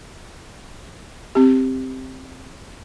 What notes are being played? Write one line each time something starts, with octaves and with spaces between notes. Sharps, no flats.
C4 G4